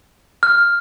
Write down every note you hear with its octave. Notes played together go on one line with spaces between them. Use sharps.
F6